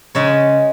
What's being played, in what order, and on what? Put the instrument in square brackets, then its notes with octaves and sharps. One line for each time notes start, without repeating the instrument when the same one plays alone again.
[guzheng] C#3 G#3 C#5